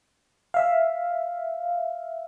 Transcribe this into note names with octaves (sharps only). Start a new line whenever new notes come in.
E5 F5